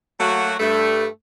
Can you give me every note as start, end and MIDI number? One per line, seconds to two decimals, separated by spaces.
0.19 0.54 54
0.19 0.54 57
0.19 0.54 58
0.19 0.54 66
0.59 1.05 43
0.59 1.05 57